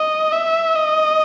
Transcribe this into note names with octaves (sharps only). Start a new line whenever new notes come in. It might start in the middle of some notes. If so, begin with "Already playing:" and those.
Already playing: D#5
E5
D#5